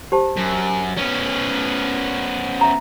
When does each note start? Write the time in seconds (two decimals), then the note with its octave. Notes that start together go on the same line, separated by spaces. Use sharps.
0.12 G4 C5 A5
0.37 F#2
0.97 B3 C#4
2.61 E5 A#5